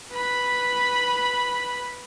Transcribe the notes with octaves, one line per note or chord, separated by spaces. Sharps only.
B4 B5